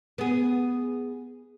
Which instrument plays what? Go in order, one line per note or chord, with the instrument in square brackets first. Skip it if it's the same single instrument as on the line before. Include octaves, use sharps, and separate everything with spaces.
[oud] B3 G#4